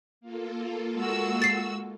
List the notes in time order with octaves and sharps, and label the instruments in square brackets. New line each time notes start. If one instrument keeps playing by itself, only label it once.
[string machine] A#3 F4 A4
[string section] G#3 F#4 E6
[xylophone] A6 C7